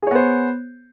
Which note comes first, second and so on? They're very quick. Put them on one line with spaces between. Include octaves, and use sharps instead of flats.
G#4 C#5 B3 C5